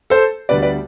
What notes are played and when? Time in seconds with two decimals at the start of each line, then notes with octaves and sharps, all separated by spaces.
0.10 A4 C5
0.49 D2 D3 G3 B3 B4 D5
0.62 B4 D5